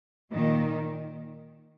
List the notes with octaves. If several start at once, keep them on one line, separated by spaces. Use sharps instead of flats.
A#2 D#3